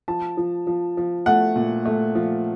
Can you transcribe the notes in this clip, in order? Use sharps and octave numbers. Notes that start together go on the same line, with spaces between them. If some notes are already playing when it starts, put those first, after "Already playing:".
F3 A5
F3
F3
F3
A3 F#5
A#2
A3
F3